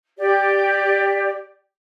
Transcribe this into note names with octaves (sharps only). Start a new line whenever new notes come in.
G4 D5